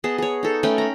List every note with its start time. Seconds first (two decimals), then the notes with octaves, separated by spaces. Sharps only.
0.04 B3 G#4 D#5 A5
0.18 G#4 C#5
0.43 D#4 A4
0.63 A3 C#4 B4 G5
0.78 A#5 B5